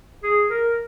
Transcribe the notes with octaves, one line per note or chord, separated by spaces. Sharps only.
G#4
A#4